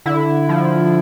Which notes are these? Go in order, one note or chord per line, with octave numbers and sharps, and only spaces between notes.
D3 E4
F3